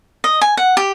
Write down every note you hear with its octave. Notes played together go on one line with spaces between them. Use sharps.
D#5
G#5
F#5
G4